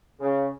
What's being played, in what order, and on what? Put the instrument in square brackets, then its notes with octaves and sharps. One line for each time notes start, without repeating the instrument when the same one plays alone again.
[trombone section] C#3